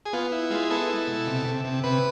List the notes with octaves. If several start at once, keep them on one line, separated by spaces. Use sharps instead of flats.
G#4
B3 F4
E4
G#3 F4
B3 A4
E4
B2
C3
C3
C3
C3 B4